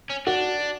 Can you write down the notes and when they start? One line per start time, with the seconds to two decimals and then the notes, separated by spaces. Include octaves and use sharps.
0.10 C#4
0.27 D4 F#4